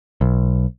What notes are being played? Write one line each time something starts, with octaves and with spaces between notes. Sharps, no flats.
B1